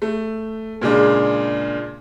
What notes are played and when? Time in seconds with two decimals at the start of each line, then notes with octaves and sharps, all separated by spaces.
0.02 A3
0.81 A#2 C#3 G#3 D4